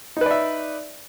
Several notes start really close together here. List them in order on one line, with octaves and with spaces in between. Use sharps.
D#4 B4 D5 E5